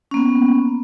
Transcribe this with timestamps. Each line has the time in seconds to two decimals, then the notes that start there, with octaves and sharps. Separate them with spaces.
0.11 C#4
0.14 A#3
0.17 B3